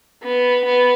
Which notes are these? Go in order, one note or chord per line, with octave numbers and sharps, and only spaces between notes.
B3
B3